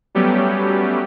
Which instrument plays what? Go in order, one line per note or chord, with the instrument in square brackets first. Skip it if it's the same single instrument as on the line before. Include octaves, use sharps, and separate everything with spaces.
[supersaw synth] F#3 G3 A3 B3 C#4 G4